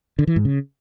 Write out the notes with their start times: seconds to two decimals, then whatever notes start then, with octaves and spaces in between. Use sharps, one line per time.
0.19 D3
0.27 E3
0.36 G#2
0.45 C#3